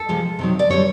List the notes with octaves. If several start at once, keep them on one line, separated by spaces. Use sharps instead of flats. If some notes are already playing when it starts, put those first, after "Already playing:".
Already playing: A4
C3 F3 G#3
C3 D#3 F#3
D5
D3 G3 C#5